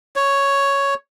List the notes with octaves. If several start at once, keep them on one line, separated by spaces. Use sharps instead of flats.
C#5